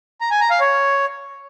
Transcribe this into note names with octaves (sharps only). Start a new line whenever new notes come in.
A#5
G#5
A#5
F5
C#5